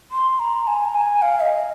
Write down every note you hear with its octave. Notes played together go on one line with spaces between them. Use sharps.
C6
A#5
G#5
A#5
G#5
F5
D#5